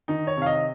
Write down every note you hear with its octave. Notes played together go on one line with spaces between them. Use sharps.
D#3 D#4
C#5
C3 F5
D#5